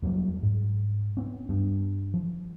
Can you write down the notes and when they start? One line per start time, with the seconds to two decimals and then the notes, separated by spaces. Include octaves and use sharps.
0.02 F2 F#3 G3 A#3
0.43 G#2
1.17 B3 C#4
1.49 G2
2.14 F3